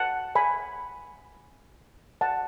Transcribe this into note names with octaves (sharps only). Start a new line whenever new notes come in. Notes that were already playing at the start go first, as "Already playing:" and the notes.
Already playing: F#5 A5
G#5 B5
F#5 A5